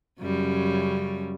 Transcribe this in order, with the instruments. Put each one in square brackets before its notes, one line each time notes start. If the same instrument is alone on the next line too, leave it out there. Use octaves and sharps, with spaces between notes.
[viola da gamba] F#2 C#3 G3